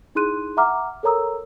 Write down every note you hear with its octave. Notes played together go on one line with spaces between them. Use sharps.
D#4 E4 G#4 C6 F#6 D#7
E5 F#5 A#5 D6 F6
A4 A#4 C#5 A#5 D#6 E6